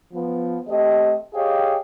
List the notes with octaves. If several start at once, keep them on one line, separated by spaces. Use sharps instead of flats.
F3 B3
A3 C4 G4 D#5
G4 G#4 C#5 D#5 F5 G5